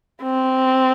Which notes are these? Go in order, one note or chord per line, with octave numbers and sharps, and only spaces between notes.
C4